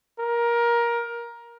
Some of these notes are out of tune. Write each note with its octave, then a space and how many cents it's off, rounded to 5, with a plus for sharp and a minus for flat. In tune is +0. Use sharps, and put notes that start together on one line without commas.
A#4 +15